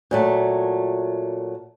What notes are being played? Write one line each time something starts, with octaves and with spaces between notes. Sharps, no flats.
A#2 F#3 A3